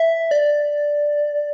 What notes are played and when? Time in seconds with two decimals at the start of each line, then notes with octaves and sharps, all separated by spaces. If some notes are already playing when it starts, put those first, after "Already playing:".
Already playing: E5
0.31 D5